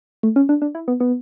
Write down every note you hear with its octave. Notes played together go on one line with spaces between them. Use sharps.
A3
C#4
D4
D4
E4
B3
B3